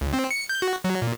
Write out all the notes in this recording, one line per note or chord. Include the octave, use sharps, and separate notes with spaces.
C#2
C4
C#7
G6
F#4
F#3
A#2